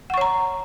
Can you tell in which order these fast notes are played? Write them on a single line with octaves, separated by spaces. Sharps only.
F#5 C#6 C#5 A#5